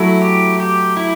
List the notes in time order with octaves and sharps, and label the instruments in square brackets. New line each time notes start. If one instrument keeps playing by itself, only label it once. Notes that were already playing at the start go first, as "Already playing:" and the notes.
Already playing: [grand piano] F#3 A3 [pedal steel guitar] E4
[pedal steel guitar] G4
G4
E4